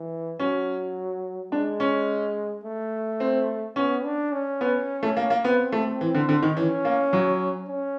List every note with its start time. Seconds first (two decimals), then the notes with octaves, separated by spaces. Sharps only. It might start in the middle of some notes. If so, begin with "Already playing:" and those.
Already playing: E3
0.39 F#3 C#4
1.52 G#3 D4
1.80 C#4
2.64 A3
3.20 C4
3.76 B3 C#4
4.04 D4
4.32 C#4
4.61 B3
5.03 A3
5.17 A#3
5.30 A#3
5.44 B3 C4
5.72 A3
6.01 E3
6.15 D3
6.29 D3
6.43 D#3
6.57 E3 C#4
6.85 A#3
7.13 F#3
7.68 C#4